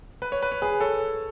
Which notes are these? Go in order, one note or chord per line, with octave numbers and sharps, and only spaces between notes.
B4
C#5
B4
C#5
G#4 B4
A4 C#5